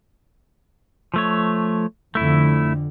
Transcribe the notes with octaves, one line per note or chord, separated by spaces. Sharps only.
F3 A3 C#5
F2 D3 A3 E4